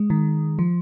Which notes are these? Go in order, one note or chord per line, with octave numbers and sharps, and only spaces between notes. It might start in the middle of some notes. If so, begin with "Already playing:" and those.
Already playing: G#3
D#3
F3